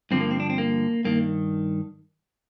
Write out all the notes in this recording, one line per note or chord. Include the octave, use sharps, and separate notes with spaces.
G2 D3 F3 C4
A#3
C4
D4
C4
A#3
G2 D#3 A#3